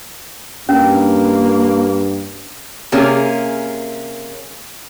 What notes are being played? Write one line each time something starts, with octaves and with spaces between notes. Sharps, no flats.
G2 A#3 C#4
C3 A#3 C#4 G#4